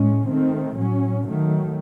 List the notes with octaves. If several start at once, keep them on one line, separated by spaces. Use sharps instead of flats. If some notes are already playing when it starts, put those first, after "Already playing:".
Already playing: A2 G#3 C#4
D#3 A3 C4
A2 F#3 C#4
D#3 F#3 A3